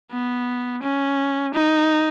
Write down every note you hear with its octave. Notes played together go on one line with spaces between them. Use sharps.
B3
C#4
D#4